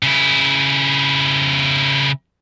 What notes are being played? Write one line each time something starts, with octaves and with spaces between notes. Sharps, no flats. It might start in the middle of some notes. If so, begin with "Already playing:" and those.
C#3 E4